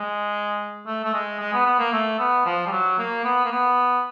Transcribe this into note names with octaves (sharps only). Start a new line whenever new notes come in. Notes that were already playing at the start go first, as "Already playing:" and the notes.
Already playing: G#3
A3
A3
G#3
G#3
B3
B3
A#3
A3
B3
F3
G3
F#3
A#3
B3
A#3
B3